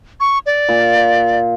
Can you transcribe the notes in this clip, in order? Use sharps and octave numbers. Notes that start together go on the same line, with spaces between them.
C#6
D5
A#2